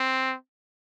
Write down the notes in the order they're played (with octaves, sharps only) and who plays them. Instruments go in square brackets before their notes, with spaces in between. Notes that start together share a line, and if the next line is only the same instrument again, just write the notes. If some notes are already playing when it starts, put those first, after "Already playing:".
Already playing: [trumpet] C4